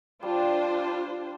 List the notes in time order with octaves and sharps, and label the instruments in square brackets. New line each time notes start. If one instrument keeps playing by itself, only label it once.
[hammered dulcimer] G3 [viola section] D4 F4 C5